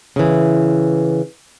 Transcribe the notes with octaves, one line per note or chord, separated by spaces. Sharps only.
C#3 E3